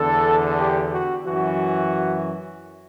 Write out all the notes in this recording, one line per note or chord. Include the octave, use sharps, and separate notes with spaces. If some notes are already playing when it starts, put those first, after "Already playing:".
Already playing: E2 D3 A4
G4
F#4
F#2 E3 F#4